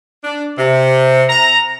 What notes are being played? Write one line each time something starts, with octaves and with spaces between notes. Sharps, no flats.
D4
C3
A#5